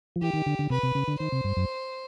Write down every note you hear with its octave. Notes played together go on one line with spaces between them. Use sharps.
F3
E3 G4
D#3
D3
D3
C3 B4
C3
C#3
D3
D#3 C5
C3
G2
F#2